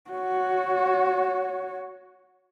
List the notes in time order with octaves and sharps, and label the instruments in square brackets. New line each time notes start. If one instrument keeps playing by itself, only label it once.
[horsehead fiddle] F#4 C#5